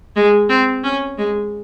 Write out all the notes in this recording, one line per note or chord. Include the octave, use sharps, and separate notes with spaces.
G#3
C4
C#4
G#3